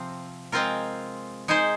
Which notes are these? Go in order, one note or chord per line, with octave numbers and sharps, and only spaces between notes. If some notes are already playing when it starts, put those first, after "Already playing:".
Already playing: C3 F3 C4
G#3 C4 F4 A#4
G#3 D#4 G#4 C5